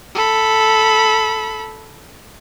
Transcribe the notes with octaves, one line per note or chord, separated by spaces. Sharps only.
A4 B5